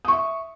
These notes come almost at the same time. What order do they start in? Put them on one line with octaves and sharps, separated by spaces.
D#6 C#6 E5